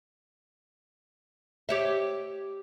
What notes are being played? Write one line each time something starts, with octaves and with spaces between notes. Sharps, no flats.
G4 C#5 E5